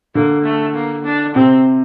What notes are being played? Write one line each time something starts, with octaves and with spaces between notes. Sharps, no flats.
D3 A#3
A3
A#3
D4
C3 C4